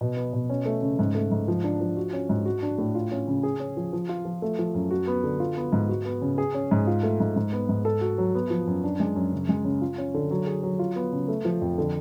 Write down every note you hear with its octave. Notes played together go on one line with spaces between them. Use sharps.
B2
B3
B2
C#4
A3
C#3
G#2
A3
G#2
F3
D4
F3
F#4
C#4
G#2
F#4
D4
A2
F4
C#4
C#3
G#4
C#4
F3
F3
F4
F3
A3
F3
F#2
F#4
B3
D3
F4
B3
G#2
F#4
B3
C#3
G#4
C#4
G#2
F4
A3
G#2
G#2
B3
G#2
A4
F#4
F#3
B3
F3
F#2
D4
G#3
F#2
C#3
G#3
C#3
F4
C#4
D3
F#3
G#4
F#3
F4
B3
C#3
A3
F3
F2
D3